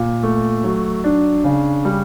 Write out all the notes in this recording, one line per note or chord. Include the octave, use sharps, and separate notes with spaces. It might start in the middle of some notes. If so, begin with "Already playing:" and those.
Already playing: A#2
A3
F#3
D4
C#3
G3